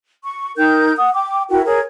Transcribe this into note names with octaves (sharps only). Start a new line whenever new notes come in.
C#6
D#4 A#4 G5 G6
F#5 D#6
G5 D6
E4 F#4 A#4 G5
G#4 A#4 C#5